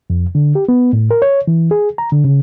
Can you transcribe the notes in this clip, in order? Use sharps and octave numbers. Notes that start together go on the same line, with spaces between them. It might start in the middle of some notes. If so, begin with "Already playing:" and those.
F2
D3
G4
B3
A2
A#4
C#5
E3
G#4
A#5
D3
C#3